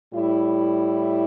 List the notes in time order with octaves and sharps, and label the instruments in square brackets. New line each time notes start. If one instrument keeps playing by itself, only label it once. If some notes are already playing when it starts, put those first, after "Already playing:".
[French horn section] A2 G3 E4